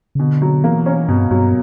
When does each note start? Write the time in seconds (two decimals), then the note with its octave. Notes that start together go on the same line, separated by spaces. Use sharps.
0.15 C#3
0.20 B2 D3
0.42 F#3
0.64 E3 A#3
0.86 C#4
1.09 G2 B2
1.31 G2 F#3